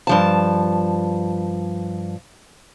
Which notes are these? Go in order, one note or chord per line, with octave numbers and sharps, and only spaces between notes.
G2 F3 A5